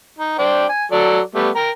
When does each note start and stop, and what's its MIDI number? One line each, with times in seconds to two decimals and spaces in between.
0.18 0.34 63
0.38 0.66 62
0.38 0.66 72
0.38 0.66 79
0.69 0.85 80
0.92 1.20 54
0.92 1.20 69
0.92 1.20 74
1.35 1.50 55
1.35 1.50 57
1.35 1.50 59
1.56 1.70 70
1.56 1.70 79
1.56 1.70 82